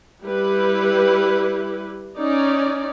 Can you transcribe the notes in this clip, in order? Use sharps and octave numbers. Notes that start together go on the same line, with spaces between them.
G3 E4 G4 B4
C#4 D#4 D5